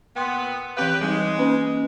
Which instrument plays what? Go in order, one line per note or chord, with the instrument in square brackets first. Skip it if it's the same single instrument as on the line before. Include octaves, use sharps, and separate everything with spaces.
[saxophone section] A#2 B3 [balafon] G5 C6
[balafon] E3 C4 F5 [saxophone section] G4 B4
[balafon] G3 C4 D#4 [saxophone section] G#3
[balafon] A#3 C#4 B4